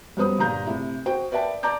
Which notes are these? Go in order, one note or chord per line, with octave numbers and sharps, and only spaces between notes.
F#2 G3 B3 C5 D#6
G1 A#2 G4 A#5 G6
C3 A3 E4
F#4 C5 G5
A#4 B4 D5 E5 G5 A5
D5 A5 A#5 D6 G6